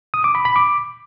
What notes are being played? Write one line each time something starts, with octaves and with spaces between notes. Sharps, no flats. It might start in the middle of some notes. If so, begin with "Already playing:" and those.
D#6
D6
B5
B5
D6